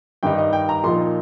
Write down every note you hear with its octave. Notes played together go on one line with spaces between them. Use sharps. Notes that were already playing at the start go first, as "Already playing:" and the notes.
G2 D#3 G3 D#4 G5
D#5
G5
A#5
A#2 F3 D#4 C6